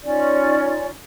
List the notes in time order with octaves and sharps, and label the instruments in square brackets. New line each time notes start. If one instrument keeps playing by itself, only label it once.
[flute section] C#4 D#4 F4 D5